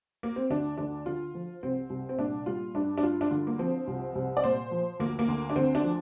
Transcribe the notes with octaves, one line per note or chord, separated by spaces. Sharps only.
A#3
C4
D2 D4
D2 D4
D3 F4
F3
C2 C4
C2
C4
A#2 D4
G3 F4
G2 D4
D4
G2 F4
D4
D3 F4
A#3
F3 C4
C2
C2
D5
A#2 C5
F3
D2 A#3
A#3
D2
D4
D3 C4
D4
F3